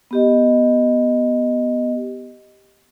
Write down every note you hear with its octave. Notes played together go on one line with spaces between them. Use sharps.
B3 G4 D#5